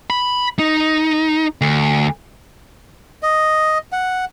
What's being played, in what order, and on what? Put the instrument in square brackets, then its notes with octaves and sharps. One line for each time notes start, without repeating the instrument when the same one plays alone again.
[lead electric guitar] B5
D#4
D2
[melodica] D#5
F#5